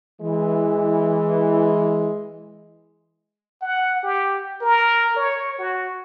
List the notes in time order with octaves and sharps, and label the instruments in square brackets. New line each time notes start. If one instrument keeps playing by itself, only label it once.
[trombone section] E3 [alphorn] G#3
[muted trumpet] F#5
G4
A#4
C#5
F#4